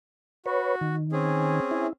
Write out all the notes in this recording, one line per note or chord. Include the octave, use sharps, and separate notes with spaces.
F#4 B4 C#5
D#3
C4 C#4 G#4
E4